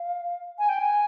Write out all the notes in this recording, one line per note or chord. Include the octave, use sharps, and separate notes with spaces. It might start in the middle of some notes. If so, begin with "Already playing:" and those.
Already playing: F5
G#5
G5
G#5